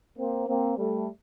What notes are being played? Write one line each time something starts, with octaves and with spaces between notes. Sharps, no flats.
A#3 C4
A#3 C4
G3 A3